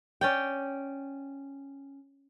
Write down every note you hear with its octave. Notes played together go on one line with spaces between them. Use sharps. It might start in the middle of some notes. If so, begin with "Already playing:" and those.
C#4 D5 G5